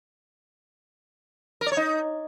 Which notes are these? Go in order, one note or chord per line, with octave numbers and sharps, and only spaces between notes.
A#4
D5
C#5
D#4